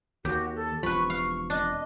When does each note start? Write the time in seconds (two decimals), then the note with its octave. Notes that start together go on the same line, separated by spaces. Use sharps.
0.25 D#2 F#4 G4
0.56 A4
0.83 E1 C#2 F3 B4 B5 C#6
1.10 F5 C#6
1.50 D4 D#5